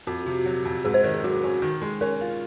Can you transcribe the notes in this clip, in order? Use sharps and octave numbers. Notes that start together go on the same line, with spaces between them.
F2 F#4
C3
F#3
F2
G#2 G#4
C5
D#3 A#4
G#4
F#3 F#4
C#4
D#3
G#3
C#4 A#4
F4